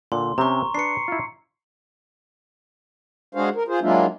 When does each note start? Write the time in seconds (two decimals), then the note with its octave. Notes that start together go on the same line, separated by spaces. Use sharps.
0.12 A#2 D3 C6
0.38 C3 C4 C#4 A#5 C#6
0.75 D4 B4 C7 C#7
1.08 E4 F4
3.35 G#3 D4 F#4 G#4 C5 F5
3.55 A#4
3.68 F4 G#4 C5
3.81 F#3 G#3 A#3 D4 E4 F4